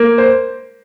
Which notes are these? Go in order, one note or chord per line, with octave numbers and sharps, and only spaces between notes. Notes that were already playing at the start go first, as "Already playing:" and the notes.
Already playing: A#3
C5